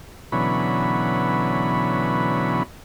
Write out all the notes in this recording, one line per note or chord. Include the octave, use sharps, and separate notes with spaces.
B2 D3 E3 F#3 C#4 B5